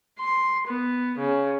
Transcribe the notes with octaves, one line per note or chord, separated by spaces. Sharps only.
C6
B3
C#3